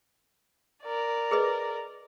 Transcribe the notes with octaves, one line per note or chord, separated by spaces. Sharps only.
A#4 D5
G#4 B4 D#5